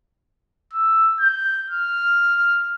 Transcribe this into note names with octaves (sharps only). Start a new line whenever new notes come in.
E6
G6
F6